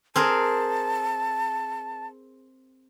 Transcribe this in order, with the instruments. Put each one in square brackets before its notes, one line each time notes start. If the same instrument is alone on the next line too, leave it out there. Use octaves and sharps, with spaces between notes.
[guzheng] C4 G#4 A#4 [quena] A5